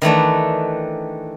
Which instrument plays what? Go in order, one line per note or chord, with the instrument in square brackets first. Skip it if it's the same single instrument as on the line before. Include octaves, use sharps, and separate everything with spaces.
[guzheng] D#3 E3 A3 D4